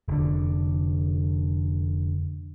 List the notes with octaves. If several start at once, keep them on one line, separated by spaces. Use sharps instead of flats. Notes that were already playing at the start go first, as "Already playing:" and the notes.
F1 D3